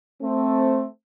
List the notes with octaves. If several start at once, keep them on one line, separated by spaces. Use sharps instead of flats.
A3 C4